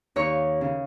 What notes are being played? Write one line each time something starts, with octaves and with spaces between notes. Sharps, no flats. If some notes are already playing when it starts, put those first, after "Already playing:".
D#2 C#5
C#3